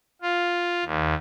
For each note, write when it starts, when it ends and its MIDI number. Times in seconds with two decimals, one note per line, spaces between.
0.22 0.84 65
0.85 1.15 39